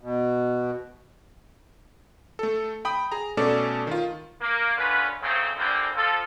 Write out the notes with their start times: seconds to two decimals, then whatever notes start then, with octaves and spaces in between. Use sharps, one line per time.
0.01 B2
2.39 A3 A4
2.85 G5 B5 D#6
3.12 G#4 A#5
3.37 B2 A3 C#4 A4 D5 A5
3.87 D#3 F4
4.41 A#3
4.76 D#2 D3 C#4 F4 B4
5.21 G#2 C#3 F#3 A3 C4
5.56 A#1 D3 E3 G3 A#3 C4
5.95 F3 F4 A4